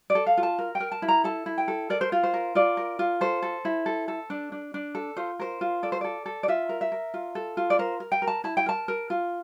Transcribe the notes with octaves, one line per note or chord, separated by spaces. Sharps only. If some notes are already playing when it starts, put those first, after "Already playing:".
D5
A4
F5
F4
A5
A#4
G5
A#4
A5
E4
A#5
A4 A5
E4
G5
A4
A#4 D5
C5
F4
C5
A#4
F4 D5
A#4
F4
A4 C5
A4
E4
A4
A4
D4
D4
D4
A4
F4 C5
A#4 C5
F4
A4 D5
C5
A4 D5
A4
D5
F4 E5
A#4
E5
A#4
F4
A4
F4
D5
A#4 C5
A#4
G5
A#4
A5
E4 A5
G5
A#4 A5
A#4
F4